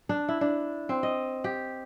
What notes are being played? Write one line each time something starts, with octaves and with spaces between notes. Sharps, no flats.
D4
E4
D4
C4
D#5
G4